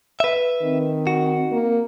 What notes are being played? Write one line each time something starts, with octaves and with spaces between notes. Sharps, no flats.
B4 E5
D#3 C4
F#4
A#3